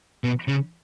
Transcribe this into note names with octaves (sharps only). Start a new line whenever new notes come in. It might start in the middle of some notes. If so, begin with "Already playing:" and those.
B2
C#3